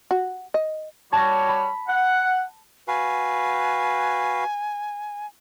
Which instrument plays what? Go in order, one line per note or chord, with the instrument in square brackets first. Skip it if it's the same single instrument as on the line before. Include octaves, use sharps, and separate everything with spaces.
[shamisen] F#4
D#5
[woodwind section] G3 F#4 C#5 [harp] A5 A#6
[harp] B5
[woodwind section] F#5
[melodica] F#4 B4 F5 [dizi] G#5